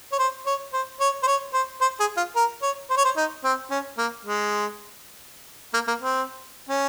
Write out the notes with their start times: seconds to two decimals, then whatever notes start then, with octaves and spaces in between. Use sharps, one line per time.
0.12 C#5
0.19 C5
0.46 C#5
0.73 C5
1.00 C#5
1.23 C5
1.27 C#5
1.53 C5
1.81 C5
2.00 G#4
2.17 F4
2.36 A#4
2.62 C#5
2.90 C5
2.97 C#5
3.05 C5
3.16 D#4
3.44 C4
3.70 C#4
3.98 A#3
4.25 G#3
5.74 A#3
5.88 A#3
6.02 C4
6.69 C#4